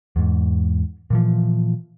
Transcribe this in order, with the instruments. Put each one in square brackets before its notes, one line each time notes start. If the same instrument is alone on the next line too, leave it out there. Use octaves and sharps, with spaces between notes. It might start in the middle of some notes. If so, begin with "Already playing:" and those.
[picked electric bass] E2 G#2
A#2 E3 F3